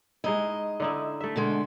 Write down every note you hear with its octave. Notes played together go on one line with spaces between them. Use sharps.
G#3 D#4 E4 D#5
D3 D#4 E4
A3 E5
B2 D3 G#3